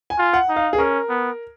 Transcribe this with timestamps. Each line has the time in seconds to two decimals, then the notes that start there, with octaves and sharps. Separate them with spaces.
0.10 G#5
0.18 F4
0.33 F#5
0.49 D#4
0.56 F5
0.73 G#4
0.78 C#4 A#4
1.09 B3